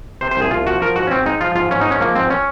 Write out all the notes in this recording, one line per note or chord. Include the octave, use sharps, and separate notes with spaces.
C3 C5
C5
C2 G#4
C2 F4
F3 F#4
F3 A#4
G#2 F#4
C#4
G#2 C4
G#3 D#4
F3 F4
G#2 F4
G#2 C#4
D#4
G#3 C#4
F3 A#3
G#2 C4
C#4